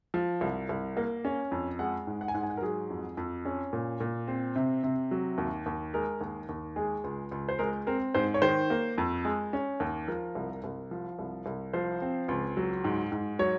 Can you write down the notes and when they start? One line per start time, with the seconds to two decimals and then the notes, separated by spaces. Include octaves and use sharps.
0.14 F3
0.41 C2
0.69 C2
0.97 A#3
1.25 C#4
1.52 F2
1.79 G#3 F#5
2.07 G#2
2.21 F#5
2.28 G#5
2.34 G#2 F#5
2.43 G#5
2.50 F#5
2.57 A#4
2.62 F#3 G#4
2.90 F2
3.17 F2
3.45 C#4
3.73 A#2
4.00 A#2
4.28 C4
4.56 C3
4.84 C3
5.11 F#3
5.38 D#2
5.66 D#2
5.94 G#3 A#4
6.21 D#2
6.49 D#2
6.76 G#3 G#4
7.04 C#2
7.31 C#2
7.49 C5
7.59 G#3 A#4
7.87 C4 A#4
8.14 G#2 C5
8.34 C#5
8.42 D#3 C5
8.70 A#3
8.98 F2
9.25 G#3
9.53 C#4
9.80 D#2
10.08 F3 A#4
10.35 C2
10.64 C2
10.91 F3
11.19 C2
11.46 C2
11.73 F3 C5
12.02 C4
12.28 C#2
12.57 F#3
12.84 G#2
13.12 G#2
13.39 F#3 C#5